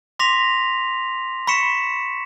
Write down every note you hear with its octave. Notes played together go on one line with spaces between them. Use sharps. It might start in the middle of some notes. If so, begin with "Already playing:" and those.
C6 D6 A#6 B6 F7
B5 C#6 B6 C#7 E7